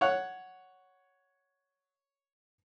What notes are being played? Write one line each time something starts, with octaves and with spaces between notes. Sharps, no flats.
C#5 F#5